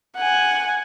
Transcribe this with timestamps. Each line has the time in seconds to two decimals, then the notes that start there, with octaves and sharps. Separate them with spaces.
0.17 F#5 G#5